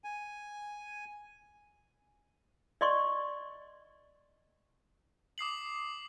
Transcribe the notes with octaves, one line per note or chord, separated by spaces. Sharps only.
G#5
D5 D#5 C6 C#6
D6 D#6 C7 F#7